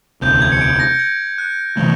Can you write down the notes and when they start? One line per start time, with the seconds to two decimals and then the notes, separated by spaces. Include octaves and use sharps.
0.21 E1 D2 C3 G6
0.42 G#6
0.52 C#7
0.61 D7
0.80 A#6
0.99 G#6
1.38 F#6
1.77 C3 E3 A3